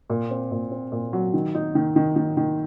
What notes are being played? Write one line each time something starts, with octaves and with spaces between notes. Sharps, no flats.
A#2
C4
A#2
C4
A#2
F#3
D#3
D#4
D#3
D#3
D#3
D#3